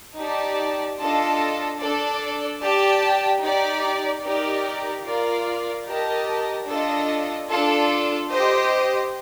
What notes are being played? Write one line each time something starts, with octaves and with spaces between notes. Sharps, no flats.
D#4 G4 D5 A5
D4 F4 A4 D#5 A5
D4 A4 D5
G4 D5 A5
D#4 G4 D5
D#4 G4 A#4 D5
F4 A#4 D5 F5
G4 A#4 D#5 A5
D4 F4 A4 D#5
D4 F4 A4
G4 C5 D#5